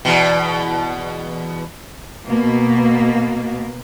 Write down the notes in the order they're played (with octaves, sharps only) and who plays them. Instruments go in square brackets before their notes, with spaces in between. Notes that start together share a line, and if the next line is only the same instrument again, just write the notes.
[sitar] E2 B2
[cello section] B2 A#3